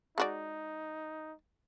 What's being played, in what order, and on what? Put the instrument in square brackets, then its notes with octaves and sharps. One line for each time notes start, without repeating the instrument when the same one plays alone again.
[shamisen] G#3 F#4 D5 [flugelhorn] D#4